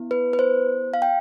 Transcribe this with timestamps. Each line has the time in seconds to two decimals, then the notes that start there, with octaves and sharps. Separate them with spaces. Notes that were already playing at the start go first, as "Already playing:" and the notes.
Already playing: B3 E4
0.11 B4
0.33 B4
0.39 C5
0.94 F5
1.02 G5